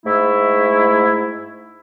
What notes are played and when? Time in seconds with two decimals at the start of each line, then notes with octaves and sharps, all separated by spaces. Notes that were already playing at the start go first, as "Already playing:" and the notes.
0.06 G#2 A3 E4